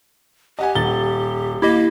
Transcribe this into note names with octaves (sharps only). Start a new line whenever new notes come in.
G4 D#5 F#5 G#5
D#1 A6 G7
A#3 E4 G4 D#5